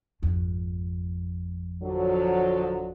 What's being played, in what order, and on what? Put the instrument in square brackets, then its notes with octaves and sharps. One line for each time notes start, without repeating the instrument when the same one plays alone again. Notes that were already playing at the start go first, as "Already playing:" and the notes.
[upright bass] G#1 F2
[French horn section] D3 F3 F#3